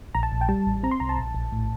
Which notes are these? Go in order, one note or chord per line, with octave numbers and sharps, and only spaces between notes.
A#1 A#5
A5
A#1
G5
G3 A5
A1
C4 A#5
C6
C2 A#5
A5
A#1
A#1
A2